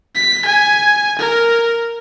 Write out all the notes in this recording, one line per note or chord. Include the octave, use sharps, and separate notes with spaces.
B6
G#5
A#4